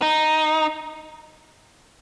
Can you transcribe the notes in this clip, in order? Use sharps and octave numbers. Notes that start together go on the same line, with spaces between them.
D#4